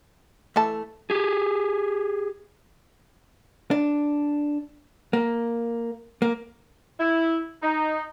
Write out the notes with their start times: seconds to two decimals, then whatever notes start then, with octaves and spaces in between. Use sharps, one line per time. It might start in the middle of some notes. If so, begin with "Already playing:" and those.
0.56 E3 A3 A5
1.10 G4 G#4
3.71 D4
5.13 A#3
6.22 A#3
7.00 E4
7.63 D#4